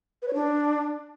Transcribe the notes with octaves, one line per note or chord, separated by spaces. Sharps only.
B4
C#5
D4